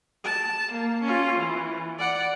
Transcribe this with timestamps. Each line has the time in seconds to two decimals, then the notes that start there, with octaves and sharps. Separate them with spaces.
0.24 A5
0.72 A#3
1.03 C#4 F4
1.36 E3
1.98 D5 F#5